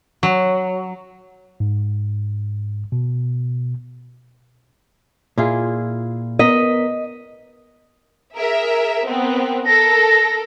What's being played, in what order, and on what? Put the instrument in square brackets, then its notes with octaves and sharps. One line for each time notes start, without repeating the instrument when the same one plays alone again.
[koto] F#3
[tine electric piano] G#2
B2
[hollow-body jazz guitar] A#2 [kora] E4 F4 G#4
[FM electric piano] B3 A#4 B6 [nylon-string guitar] D#5
[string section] G#4 A#4 E5
B3 C4 A#4
[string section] A4 A#4 [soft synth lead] A#6